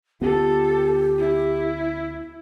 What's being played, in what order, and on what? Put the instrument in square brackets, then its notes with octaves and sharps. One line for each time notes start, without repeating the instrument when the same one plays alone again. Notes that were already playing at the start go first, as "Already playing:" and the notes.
[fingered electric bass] D2 B3 [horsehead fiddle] F4 A4 [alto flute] G4
[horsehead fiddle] E4